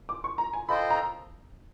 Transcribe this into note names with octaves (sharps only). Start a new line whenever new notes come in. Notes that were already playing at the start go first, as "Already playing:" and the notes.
D6
C#6
A#5
G#5
F4 A4 C5 D#5 G5 B5
A#5